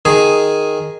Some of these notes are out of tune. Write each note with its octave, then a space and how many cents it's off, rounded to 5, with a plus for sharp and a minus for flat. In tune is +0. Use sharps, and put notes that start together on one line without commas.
D#3 +0 G#4 +0